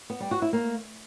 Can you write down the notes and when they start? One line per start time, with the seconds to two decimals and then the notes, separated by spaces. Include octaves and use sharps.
0.10 B3
0.20 G3
0.31 F#4
0.42 E4
0.53 A#3